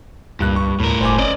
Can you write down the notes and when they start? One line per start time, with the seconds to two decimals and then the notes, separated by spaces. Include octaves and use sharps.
0.40 C#2 G2 A#2 F#6
0.56 C#6
0.80 D2 A2 A#4
1.01 F#1 C5 G#5 D6
1.18 C#4 D5 D#5